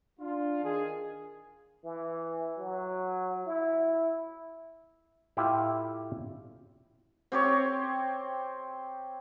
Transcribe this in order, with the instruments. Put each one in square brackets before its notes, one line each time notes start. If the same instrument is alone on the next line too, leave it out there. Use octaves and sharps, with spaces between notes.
[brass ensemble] D4 F4
D#3 G#4
[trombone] E3
F#3
E4
[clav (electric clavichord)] A2 E4 F4 G4 G5
[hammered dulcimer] C4 G4 C#5